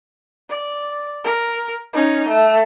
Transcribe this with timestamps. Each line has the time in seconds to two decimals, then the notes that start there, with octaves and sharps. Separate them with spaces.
0.50 D5
1.24 A#4
1.93 C#4 D#4
2.28 A3